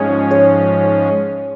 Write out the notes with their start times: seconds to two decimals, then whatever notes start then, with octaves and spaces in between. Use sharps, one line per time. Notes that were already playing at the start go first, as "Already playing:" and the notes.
Already playing: G#2 F3 G#3 C#4 G#4 C#5 D#5 G#5
0.31 G#4 C#5